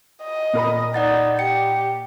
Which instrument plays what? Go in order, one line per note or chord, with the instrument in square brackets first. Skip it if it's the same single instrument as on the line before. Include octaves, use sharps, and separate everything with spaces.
[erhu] D#5
[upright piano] A#2 A#4 B5
[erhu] D#4 [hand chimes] D5 F#5 A6
[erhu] G4 [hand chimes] C#7